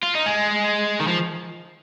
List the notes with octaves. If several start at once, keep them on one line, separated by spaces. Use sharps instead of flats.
F4
D#4
G#3
D#3
F3